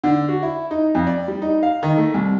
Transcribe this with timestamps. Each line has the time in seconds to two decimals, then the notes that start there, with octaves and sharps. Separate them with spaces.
0.04 D3
0.29 F#4
0.43 E4
0.71 D#4
0.95 F2
1.07 D5
1.28 G3
1.42 D#4
1.63 F5
1.83 D#3
1.97 A3
2.14 C2